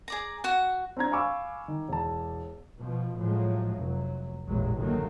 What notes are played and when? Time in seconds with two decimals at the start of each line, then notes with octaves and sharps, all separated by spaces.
0.08 G#4 D5 A#5
0.44 F#4 F#5
0.97 C4 D4 A#5 G#6
1.12 F5 G#5 B5 C#6 D6 E6
1.68 D#3
1.89 E1 A5
2.79 B2 F3
3.17 A2 F3 F#3 G#3
3.76 F1 F#3
4.47 A1 E2 A#2 F#3 G#3
4.76 D2 G2 D#3 F#3 A3 A#3